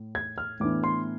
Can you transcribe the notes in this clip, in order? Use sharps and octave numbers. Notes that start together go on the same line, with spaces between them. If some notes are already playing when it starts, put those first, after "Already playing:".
Already playing: A2
G#6
F6
A2 E3 B3 D4 D6
C6